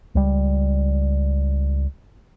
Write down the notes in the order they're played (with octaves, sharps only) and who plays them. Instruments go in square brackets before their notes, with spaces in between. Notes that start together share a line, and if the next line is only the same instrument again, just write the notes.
[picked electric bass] C#2 G3